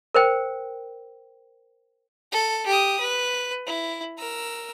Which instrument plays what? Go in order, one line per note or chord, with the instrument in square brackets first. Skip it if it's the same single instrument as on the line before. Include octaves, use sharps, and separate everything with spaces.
[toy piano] A#4 C5 G5
[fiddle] A4
G4 D#6
B4
E4
A#4 E6